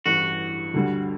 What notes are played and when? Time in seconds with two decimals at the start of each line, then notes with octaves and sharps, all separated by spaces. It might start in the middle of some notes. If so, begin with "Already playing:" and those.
0.06 A1 G2 E3 G3 F#4
0.74 D2 D3 G3